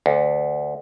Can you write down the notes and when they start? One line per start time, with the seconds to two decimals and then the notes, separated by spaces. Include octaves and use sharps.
0.06 D2